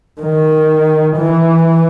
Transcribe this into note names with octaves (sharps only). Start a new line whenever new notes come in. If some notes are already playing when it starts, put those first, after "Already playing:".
D#3
E3